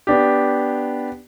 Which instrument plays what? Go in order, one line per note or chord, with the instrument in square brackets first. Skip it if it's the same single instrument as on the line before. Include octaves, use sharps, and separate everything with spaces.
[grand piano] B3 D4 G4